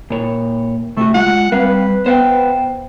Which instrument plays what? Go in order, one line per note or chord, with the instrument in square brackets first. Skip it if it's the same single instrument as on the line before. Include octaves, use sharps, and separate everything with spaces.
[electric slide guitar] A#2 C#5
[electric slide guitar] C3 F#4 [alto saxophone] A3
[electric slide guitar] G#3 F4 [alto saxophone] F#5
[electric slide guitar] G3 C4 F5 [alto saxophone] B4
[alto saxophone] B3 [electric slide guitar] C5 F5 G5